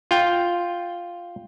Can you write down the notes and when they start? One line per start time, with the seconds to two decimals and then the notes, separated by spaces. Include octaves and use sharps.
0.11 F4 G5